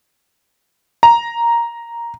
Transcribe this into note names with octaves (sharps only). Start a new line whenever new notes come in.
A#5